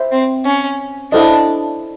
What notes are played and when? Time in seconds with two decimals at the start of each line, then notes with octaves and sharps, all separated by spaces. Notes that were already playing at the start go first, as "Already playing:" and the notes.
Already playing: C5 E5
0.12 C4
0.45 C#4
1.12 D4 E4 A4 C5 D#5